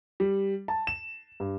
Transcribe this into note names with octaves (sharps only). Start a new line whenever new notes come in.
G3
A5
E7
G2